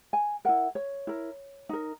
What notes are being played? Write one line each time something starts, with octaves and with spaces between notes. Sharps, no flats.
G#5
E4 A#4 F#5
C#5
E4 A#4
D#4 A#4